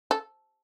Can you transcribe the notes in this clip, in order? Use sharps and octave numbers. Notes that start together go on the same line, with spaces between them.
A4